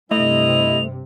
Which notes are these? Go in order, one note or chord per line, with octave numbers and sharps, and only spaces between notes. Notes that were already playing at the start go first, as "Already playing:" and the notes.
G2 C3 A3 E4 D#5 F7